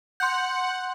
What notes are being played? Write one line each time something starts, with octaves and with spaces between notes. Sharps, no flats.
F#5 C6 G6